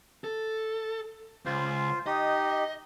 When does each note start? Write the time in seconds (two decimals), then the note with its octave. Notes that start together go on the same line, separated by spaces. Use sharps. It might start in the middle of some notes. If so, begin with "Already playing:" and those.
0.24 A4
1.46 C#2 F4 C5
2.06 D#4 G4 D#5